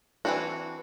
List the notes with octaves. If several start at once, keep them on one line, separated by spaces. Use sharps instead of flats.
E3 G3 C4 D4 F#4